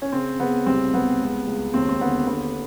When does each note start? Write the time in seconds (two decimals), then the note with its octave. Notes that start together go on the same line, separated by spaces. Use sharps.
0.02 C#4
0.12 C#3 C4
0.39 C#3 B3
0.66 C2 C4
0.93 C2 B3
1.21 C#2
1.47 C#2
1.74 D#2 C4
1.89 C4
2.01 D3 B3
2.27 D3 B3